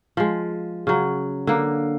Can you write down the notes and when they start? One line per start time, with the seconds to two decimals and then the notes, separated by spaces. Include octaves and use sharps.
0.17 F3 G#3
0.87 C#3 F#3
1.47 D3 A#3